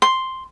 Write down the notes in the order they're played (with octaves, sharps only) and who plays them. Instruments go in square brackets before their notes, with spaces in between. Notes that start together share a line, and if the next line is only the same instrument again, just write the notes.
[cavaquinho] C6